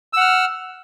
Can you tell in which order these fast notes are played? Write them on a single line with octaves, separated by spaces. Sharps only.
E6 F#5 F6